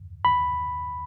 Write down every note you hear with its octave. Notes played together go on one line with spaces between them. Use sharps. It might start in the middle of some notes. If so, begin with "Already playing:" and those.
B5